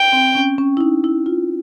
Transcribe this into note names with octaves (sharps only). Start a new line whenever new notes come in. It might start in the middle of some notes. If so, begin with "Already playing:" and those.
Already playing: G5
C4
C#4
C#4
E4
D#4
E4
F4